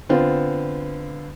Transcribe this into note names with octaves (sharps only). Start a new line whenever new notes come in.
D3 B3 C4 F4